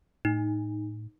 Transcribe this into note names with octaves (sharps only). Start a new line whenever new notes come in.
A2 D#4